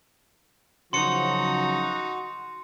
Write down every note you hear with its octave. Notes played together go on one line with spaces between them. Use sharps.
C#3 F3 F#3 D#4 F#4 C6 C#7